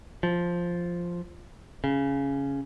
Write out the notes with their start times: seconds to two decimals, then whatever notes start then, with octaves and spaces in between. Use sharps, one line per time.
0.23 F3
1.84 C#3